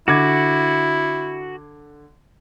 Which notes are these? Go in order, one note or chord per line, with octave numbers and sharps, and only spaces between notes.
D3 E4 F#4 D6 G#6